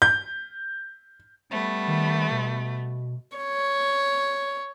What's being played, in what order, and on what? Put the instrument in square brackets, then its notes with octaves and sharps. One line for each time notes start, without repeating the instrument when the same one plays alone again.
[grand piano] G6
[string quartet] G3 A3 B3
[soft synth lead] D#3
B2
[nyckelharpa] C#5